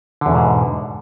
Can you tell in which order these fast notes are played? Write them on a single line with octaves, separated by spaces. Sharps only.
D3 E2 B2 G#2